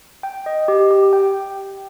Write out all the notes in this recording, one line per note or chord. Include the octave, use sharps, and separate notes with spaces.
G5
D#5
G4
G4
G5